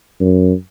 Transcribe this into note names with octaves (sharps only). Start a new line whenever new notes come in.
F#2